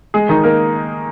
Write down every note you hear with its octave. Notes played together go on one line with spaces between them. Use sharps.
G#3 G#4
D#3 D#4
A#3 A#4